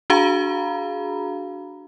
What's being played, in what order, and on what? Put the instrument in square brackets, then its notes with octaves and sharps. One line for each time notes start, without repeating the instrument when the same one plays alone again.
[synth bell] D4 F#4 G#4 F5 A#5 B5